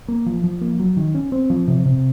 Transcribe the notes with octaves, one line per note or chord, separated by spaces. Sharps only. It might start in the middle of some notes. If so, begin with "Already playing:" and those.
A#3
F3
F3
A#3
F#3
D#3
C#4
C4
F3
C3
C3